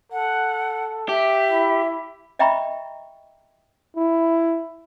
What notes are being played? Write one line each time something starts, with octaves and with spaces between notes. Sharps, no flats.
A4 F#5
G4 E5
E4
D#5 E5 G5 A#5 B5 C#6
E4